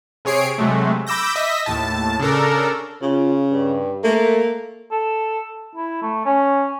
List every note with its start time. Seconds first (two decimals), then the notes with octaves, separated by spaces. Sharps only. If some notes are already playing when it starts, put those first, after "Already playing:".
0.25 C3 G#4 C#5 C7 D7
0.58 C3 F#3 G#3 A3
1.07 B5 D6 E6 G6 A#6
1.36 D#5 E5 B6
1.66 D#2 A2 A5
2.20 C#3 D4 A4 A#4
3.02 C#3 F4
3.51 G2
4.04 A3 A#3
4.91 A4
5.75 E4
6.02 A3
6.26 C#4